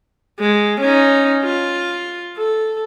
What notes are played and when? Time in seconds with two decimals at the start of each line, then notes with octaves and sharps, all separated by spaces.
0.40 G#3
0.81 C#4 D#4
1.44 F4
2.37 A4